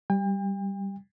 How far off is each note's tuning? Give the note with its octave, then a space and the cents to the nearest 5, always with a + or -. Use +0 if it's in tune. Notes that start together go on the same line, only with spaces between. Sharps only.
G3 +0 G5 +40